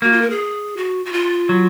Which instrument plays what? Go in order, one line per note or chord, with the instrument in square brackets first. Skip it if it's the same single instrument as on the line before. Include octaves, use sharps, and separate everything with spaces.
[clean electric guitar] A#3 [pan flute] F#4
[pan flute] F4
A#4
G#4
F#4
F#4
F4
[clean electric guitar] F#3